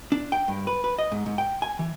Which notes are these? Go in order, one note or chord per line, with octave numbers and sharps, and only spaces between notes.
D4
G5
G2
B4
B4
D#5
G#2
G#2
G5
G#5
E3